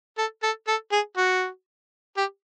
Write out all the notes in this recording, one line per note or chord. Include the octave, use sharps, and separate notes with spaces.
A4
A4
A4
G#4
F#4
G4